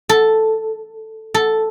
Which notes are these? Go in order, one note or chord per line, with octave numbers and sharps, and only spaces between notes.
A4
A4